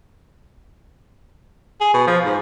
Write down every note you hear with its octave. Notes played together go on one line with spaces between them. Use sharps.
G#4
B2
F3
G#2